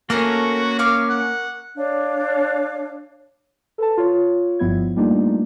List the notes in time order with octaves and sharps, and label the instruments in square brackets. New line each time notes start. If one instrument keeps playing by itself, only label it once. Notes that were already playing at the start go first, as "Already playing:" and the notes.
[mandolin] A3 A#4 A#5 [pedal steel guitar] A#3 C#4 [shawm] F#4
[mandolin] A#4 C#6 D6 [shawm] F5
[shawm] F#5
[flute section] D4 C#5 F5
[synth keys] A4 B4 A5
F4 C#5
G1 G2 F3 B3 E4 G#6
G3 A3 A#3 D4 D#4 F4